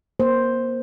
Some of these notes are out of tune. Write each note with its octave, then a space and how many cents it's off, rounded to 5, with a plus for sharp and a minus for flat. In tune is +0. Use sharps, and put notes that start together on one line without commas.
A#3 +25 C5 +5